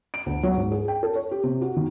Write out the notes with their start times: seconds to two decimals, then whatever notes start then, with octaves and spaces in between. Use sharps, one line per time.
0.14 D7
0.26 D2
0.43 F#3
0.57 G#2
0.72 G#4
0.88 G5
1.03 A4
1.15 C#5
1.31 G4
1.44 C3
1.61 F#4
1.76 D#3